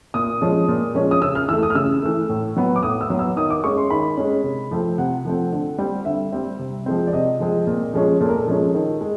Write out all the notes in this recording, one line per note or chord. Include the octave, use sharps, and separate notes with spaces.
A#2 D#6
F3 G#3 C#4
A#2
F3 G#3 C#4
D#6
C#3 E6
F6
E3 A3 E6
D#6
F6
C#3 E6
E3 A3
A2
F#3 B3
D6
A2 D#6
E6
F#3 B3
E6
D#3 D#6
D6
G#3 C#4 C#6
C6
D#3 B5
G#3 C#4
C3
F3 A3 C4
C3 F#5
F3 A3 C4
D3
G3 C4
D3 E5
G3 C4
C3
F3 G#3 C4
D5
C3 D#5
F3 G#3 C4
A#2
F3 G#3 C#4
A#2 A4
A#4
A4
F3 G#3 C#4
D#3
G#3